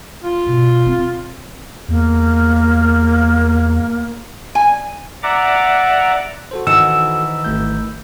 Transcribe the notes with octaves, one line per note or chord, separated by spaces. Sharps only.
F4
B2
C4
E2 A#3
G#5
D5 E5 F#5 A#5 D6
F#4 A4 C5
D#3 E3 F#5 E6
G#1 A3 G6